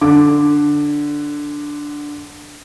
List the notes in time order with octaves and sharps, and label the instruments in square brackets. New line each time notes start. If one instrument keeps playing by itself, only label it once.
[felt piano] D3 D6